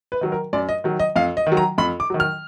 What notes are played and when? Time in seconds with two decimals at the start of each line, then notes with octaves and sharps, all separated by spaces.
0.12 B4
0.21 D#3 F#3
0.32 A#4
0.53 F#2 D5
0.69 D#5
0.84 D#3 F#3
0.99 D#5
1.15 F2 F5
1.37 D#5
1.47 D#3
1.52 F#3
1.57 A#5
1.78 F2 B5
2.00 D6
2.10 D#3 F#3
2.20 F6